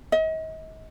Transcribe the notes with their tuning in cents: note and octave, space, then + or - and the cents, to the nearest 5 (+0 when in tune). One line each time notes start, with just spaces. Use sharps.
D#5 +40